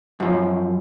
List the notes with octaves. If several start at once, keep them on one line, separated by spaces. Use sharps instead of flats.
F#2 F3